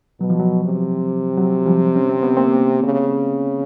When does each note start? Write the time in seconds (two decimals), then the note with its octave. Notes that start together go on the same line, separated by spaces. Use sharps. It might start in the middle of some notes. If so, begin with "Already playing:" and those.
0.20 B2 F#3
0.30 F3
0.40 F#3
0.64 C3
1.38 F#3
1.66 F3 G3
1.96 C#4
2.09 C4
2.23 B3
2.37 A#3 C4
2.83 C#3